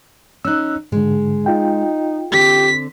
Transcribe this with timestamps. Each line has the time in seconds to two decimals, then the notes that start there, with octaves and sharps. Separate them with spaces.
0.45 C#4 D#4 E6 F#6
0.92 G#2 D3 G#3
1.46 D#4 F4 G5
2.32 D3 C4 G4 B6